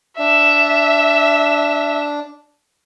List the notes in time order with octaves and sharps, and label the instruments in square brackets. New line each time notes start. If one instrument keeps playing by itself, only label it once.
[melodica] D4 [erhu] E5